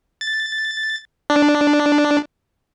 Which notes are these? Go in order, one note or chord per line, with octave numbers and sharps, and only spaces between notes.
A6
D4